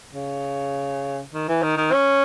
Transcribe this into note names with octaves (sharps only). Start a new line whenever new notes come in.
C#3
D#3
E3
D#3
D#3
C#4